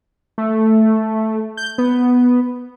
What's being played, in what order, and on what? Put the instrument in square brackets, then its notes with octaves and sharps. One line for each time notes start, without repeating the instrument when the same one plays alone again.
[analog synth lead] A3
G6
B3